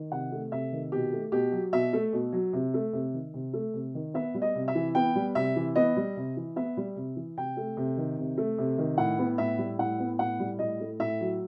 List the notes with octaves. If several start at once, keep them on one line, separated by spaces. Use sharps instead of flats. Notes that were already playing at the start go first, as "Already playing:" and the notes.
Already playing: D#3
C3 F#5
A3
C3 E5
D#3
B2 G4
A3
B2 G4
F#3
B2 E5
A3
B2
F#3
C3
A3
C3
D#3
C3
A3
C3
D#3
B3 E5
G3
D#5
C3
E5
E3
B3 G5
G3
C3 E5
E3
B3 D#5
G3
C3
E3
B3 E5
G3
C3
E3
C3 G5
A3
C3
D#3
C3
A3
C3
D#3
A2 F#5
B3
A2 E5
G3
A2 F#5
B3
A2 F#5
G3
A2 D#5
A3
A2 E5
F#3